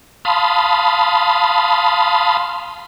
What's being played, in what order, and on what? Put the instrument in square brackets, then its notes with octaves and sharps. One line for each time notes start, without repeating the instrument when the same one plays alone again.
[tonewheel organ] F5 A5 B5 C6 D#6